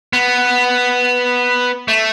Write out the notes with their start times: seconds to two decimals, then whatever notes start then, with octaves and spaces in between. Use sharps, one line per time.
0.13 B3
1.88 A3